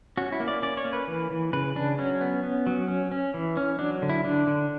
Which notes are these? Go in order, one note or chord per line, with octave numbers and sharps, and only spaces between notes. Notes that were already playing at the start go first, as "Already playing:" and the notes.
C#4 F#4
E4
A#3
D5
C#4 D5
C#5
A#3
B4
E3
E3
C#3 B4
C#3 D4
F#3 C#4
B3
B3
F#3
C#4
C#4
E3
C#4
F#3 D4
D3
E4
D3 D4
D3